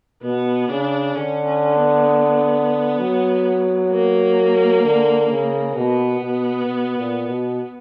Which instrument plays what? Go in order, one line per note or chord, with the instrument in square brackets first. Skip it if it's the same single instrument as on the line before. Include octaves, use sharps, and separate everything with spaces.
[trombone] B2 [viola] B3
[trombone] C#3 [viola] D4
[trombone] D3 [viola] C#4
[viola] C#4
B3
[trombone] F#3
[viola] A#3
[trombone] D3
C#3
[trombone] B2 [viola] B3
[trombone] B2
B2
A#2
B2